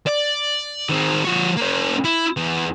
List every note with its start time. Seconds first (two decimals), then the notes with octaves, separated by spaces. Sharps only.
0.07 D5
0.89 D#3 C4
1.25 F3 C#5
1.57 A#3 C#4
2.04 E4
2.37 E2